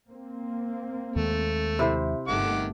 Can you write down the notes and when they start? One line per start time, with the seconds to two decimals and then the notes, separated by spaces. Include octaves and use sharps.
0.10 A#3 C4
1.16 D#2 D#3 G#3 A3
1.79 C3 E4 C5
2.28 G1 G2 D#3 A3 F#5 D6